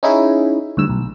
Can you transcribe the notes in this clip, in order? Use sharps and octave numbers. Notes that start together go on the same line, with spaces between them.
C#4 D#4 E4 G#4
D2 G2 E6
B1